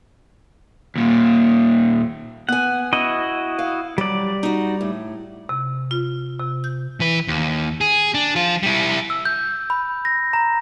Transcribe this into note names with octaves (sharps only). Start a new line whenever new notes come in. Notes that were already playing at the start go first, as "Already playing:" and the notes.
D#2 A#2
B3 F#5 G#5
C#4 E4 F#4 D#5
F5
F#3 G3 D5
D#4 F#4
A2
C3
F4
C3
G6
E3 B4
D#2
G#4
D4
F3 F4
G3 E4
E6
G6
B5
A#6
A#5